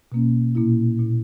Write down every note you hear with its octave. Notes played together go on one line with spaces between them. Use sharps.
B2 A#3 C#4
A#2 A#3 E4
A#2 A#3 E4